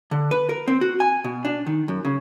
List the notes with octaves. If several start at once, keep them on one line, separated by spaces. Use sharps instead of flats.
D3
B4
A#4
C4
F#4
G#5
B2
D4
D#3
F#2
C#3